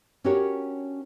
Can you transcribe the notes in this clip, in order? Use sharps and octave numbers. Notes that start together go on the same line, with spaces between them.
C#4 D4 F#4 G4 A#4 C#5